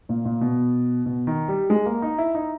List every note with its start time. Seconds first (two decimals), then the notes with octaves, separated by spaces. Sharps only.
0.09 A#2
0.25 A#2
0.41 B2
1.06 B2
1.27 D#3
1.48 G3
1.70 G#3
1.86 A#3
2.02 D#4
2.18 E4
2.35 D#4